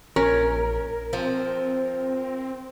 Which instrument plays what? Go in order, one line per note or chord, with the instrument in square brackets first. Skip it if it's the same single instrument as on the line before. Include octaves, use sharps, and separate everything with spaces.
[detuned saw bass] A#1 [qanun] C#4 [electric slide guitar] A#4
[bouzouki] F3 [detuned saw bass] C4